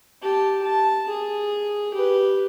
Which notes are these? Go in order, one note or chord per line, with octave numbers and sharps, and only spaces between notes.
G4 A5
A5
G#4
G4 B4